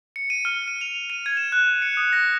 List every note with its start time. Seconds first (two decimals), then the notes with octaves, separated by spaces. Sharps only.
0.16 C#7
0.30 D#7
0.45 F6
0.68 D#7
0.81 F7
1.10 D#7
1.26 G#6
1.37 E7
1.52 F#6
1.82 C#7
1.97 D#6
2.13 A#6